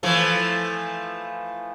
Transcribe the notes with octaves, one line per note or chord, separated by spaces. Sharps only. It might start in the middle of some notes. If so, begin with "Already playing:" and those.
E3 F3 A3